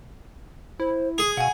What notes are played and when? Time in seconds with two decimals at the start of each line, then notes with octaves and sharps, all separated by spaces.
0.80 E4 C5
1.18 G#4 D#6
1.37 B2 F5 F#5 G#5